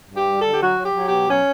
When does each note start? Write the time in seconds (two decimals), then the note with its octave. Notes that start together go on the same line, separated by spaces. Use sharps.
0.10 G2
0.15 G4
0.27 G3
0.38 A4
0.44 D3
0.53 G4
0.61 F#3 F#4
0.78 F#3
0.83 G4
0.94 F#3
1.06 G4
1.11 B2
1.28 F#3 C#4